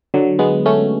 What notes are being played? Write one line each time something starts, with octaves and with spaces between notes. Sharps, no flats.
D3 F#3
G#3 B3
A3 C#4